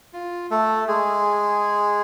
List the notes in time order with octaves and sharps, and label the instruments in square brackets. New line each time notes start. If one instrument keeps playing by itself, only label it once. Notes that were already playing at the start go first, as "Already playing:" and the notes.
[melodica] F4
A3 A4
G#3 G#4